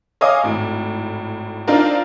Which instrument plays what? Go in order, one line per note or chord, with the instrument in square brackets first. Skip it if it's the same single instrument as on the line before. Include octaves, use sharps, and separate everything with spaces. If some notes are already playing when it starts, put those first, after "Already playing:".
[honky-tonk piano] C#5 D#5 F5 G#5 D6 D#6
G#1 A2
C4 D4 D#4 F4 A#4